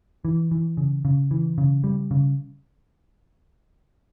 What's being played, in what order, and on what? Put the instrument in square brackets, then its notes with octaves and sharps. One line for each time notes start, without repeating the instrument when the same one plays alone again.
[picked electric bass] E3
E3
C#3
C#3
E3
C#3
G3
C#3